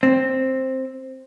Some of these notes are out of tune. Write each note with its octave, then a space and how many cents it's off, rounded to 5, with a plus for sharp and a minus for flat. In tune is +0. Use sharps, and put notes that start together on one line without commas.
C4 +5